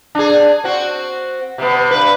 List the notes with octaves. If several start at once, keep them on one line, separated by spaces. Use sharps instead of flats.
D4 G#4
C4 F#4
C3 B3
G2 B4